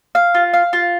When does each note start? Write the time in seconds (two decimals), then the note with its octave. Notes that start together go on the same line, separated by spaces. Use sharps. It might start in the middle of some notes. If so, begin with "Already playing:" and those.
0.15 F5
0.34 F4
0.54 F5
0.73 F4